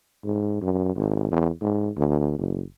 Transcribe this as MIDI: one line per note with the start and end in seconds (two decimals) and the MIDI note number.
0.24 0.56 44
0.61 0.91 42
0.96 1.28 32
1.31 1.49 40
1.61 1.90 44
1.97 2.34 38
2.38 2.63 30